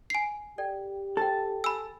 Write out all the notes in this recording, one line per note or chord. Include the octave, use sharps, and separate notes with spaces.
G#5 C7
G4 A4 D5 G5
A4 C5 G5
G#5 B5 E6